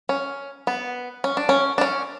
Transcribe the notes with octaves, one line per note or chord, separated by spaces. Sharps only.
C#4
B3
C#4
D4
C#4
D4
C#4